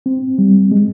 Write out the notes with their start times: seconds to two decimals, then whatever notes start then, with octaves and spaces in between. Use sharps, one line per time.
0.06 C4
0.39 G3
0.72 G#3